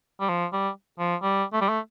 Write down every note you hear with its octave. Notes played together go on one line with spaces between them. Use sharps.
G3
F3
G3
F3
G3
A3
G3
A3